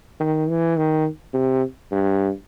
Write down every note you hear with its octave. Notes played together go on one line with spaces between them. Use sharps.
D#3
E3
D#3
C3
G2